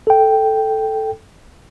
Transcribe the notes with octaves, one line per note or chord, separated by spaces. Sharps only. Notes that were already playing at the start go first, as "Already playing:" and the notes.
A4 G5